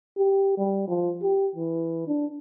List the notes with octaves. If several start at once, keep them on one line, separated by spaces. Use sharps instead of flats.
G4
G3
F3
G4
E3
D4